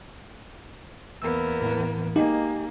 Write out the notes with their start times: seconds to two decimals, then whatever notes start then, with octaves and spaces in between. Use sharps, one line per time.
1.22 E2 A#3 B3 E6
1.62 A2 E3
2.16 A#3 D#4 G4 G#5